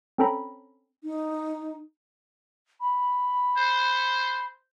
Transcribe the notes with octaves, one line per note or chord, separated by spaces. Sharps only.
C4 C#4 A4 G5 A#5 B5
D#4
B5
C5